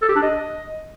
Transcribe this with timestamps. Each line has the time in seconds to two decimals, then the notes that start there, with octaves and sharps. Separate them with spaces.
0.02 A4
0.08 G4
0.15 D4
0.22 D#5